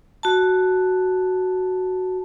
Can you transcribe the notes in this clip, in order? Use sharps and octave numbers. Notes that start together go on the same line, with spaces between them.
F#4 A5